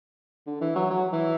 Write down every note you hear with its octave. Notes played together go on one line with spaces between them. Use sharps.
D3
E3
F#3
F#3
E3